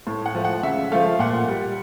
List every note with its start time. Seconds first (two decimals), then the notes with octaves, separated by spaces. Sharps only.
0.07 A2
0.26 F#5
0.35 F3 A3
0.45 F#5
0.63 C#3 E5
0.92 F3 A3 F5
1.19 A#2 F#5
1.48 G3